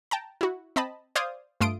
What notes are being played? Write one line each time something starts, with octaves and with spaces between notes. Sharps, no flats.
G5 A5 A#5
E4 F#4
C4 D#5 A5 B5
C5 D5 F5 D#6 G6 G#6
G2 A3 F4 C6 D#6 D7